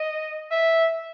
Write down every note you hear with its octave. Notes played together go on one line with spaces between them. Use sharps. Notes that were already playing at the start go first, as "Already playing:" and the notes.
Already playing: D#5
E5